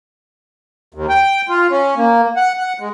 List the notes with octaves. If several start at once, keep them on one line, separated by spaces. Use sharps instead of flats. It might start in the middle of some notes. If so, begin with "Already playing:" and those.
D#2
G5
F4
C#4
A#3
F#5
F#5
G#3